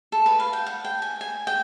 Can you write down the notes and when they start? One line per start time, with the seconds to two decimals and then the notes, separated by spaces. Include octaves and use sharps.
0.12 A4
0.26 B4
0.40 F5
0.53 G5
0.66 F#5
0.85 G5
1.02 G#5
1.21 G#5
1.47 G5